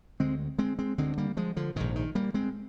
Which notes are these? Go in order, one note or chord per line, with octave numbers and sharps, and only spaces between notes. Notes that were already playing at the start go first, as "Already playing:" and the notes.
D2 D3 G#3 C4
G#3 C4
G#3 C4
D2 D3 G#3 C4
G3 A#3
F3 G#3
D3 F3
A#1 G#2 D#3
D#3
G3 A#3
G#3 C4